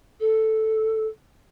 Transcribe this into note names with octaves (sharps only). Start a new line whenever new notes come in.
A4